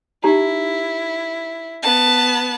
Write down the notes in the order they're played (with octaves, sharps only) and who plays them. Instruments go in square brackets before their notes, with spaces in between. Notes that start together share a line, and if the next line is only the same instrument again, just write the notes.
[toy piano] D#4 G4 A#5 [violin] E4
[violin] B3 A5